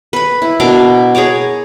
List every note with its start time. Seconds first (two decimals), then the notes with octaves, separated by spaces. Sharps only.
0.13 B4 B5
0.42 E4
0.60 B2 D4 A#4 D6
1.15 G#4 C#5 A#5 D6